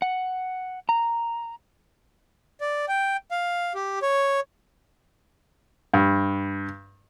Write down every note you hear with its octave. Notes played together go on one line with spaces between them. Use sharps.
F#5
A#5
D5
G5
F5
G4
C#5
G2